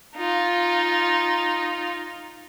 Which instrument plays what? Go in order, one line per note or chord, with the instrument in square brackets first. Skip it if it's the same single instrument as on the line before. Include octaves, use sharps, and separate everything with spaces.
[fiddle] D#4 F4